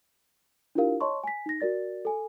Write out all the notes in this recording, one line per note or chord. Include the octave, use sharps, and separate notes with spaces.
D4 E4 F4 G4 A#4 F5
C#5 D#5 A5 C6 C#6
G#5 B6
D#4 A#6
F#4 A#4 D5 A6
A4 G#5